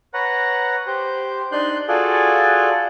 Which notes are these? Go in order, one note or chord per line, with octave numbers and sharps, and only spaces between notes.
B4 C#5 F#5 A#5
G4 C5
D4 D#4 C6 F#6 G6
F4 F#4 G#4 A4 D5